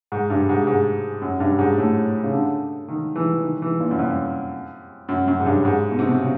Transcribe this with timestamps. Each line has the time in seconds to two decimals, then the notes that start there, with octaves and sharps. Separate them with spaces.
0.12 G#2
0.30 G2
0.49 G#2
0.67 G#2
1.22 F#2
1.40 G2
1.59 G#2
1.78 A2
2.23 C#3
2.32 D3
2.88 D#3
3.15 E3
3.43 D#3
3.62 E3
3.80 A#2
3.91 F#2
3.98 F2
5.09 F#2
5.28 F#2
5.40 G#2
5.46 G2
5.65 G#2
5.91 B2
5.99 C3
6.07 B2
6.20 C#3